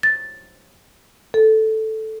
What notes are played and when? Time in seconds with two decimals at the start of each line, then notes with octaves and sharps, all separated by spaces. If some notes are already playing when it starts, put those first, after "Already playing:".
0.03 A6
1.34 A4